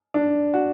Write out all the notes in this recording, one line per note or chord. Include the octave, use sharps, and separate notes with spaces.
D4
F#4